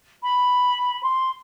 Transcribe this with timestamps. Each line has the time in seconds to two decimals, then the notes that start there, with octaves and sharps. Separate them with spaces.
0.23 B5
1.03 C6